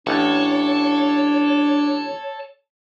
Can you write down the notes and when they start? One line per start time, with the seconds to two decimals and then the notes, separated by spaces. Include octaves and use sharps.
0.07 A1 D4 A4 C#5